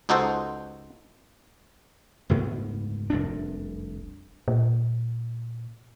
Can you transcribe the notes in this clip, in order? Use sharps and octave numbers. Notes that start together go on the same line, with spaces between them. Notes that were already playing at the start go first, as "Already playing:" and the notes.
C#2 D#4 F#4 A4 C5
F#1 D2 G#2 B3
F1 C2 F#2 D4
A#2